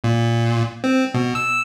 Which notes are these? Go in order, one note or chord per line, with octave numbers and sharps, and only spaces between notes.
A#2
C4
B2
E6